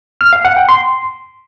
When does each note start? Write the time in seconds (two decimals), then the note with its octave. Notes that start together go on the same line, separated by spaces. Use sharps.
0.21 F6
0.33 F5
0.45 F#5
0.57 G5
0.69 C6